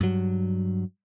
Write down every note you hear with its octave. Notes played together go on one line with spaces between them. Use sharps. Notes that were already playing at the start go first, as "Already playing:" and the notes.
G2 F#3